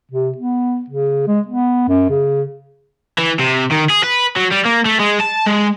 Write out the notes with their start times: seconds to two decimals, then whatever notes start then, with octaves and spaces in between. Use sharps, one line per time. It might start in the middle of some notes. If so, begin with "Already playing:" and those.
0.11 C3
0.38 B3
0.90 C#3
1.27 G#3
1.47 B3
1.88 F#2
2.10 C#3
3.19 E3
3.40 C3
3.72 D#3
3.90 G#4
4.04 B4
4.36 F#3
4.51 G3
4.65 A#3
4.86 A3
5.00 G#3
5.21 A5
5.47 G#3